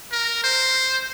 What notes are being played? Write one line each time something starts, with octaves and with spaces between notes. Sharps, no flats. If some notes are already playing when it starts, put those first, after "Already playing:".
A#4
C5